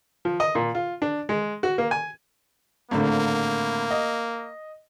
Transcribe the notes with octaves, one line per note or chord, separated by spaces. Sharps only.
F3
D#5
A#2
F4
D4
G#3
F#4
A#3
G#5
G#1 A2 D3 A#3
D#5